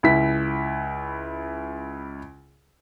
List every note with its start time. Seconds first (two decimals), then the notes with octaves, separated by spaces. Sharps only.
0.03 C#2 E4 B6